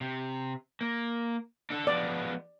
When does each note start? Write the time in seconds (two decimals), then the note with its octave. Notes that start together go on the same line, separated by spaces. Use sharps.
0.01 C3
0.81 A#3
1.70 D4 A4
1.87 F3 G#3 B3 D5